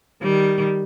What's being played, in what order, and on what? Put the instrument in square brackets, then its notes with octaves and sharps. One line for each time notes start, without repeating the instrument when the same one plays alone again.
[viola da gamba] D#3 G3